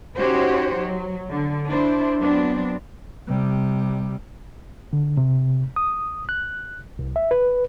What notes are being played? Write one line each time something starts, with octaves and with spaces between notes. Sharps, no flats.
C#4 D#4 F#4 G4 C5 C#5
F#3
D3
D4 E4 C5
F#3 B3 C4 D4
C3 G3
D3
C3
D#6
F#6
C2
E5
B4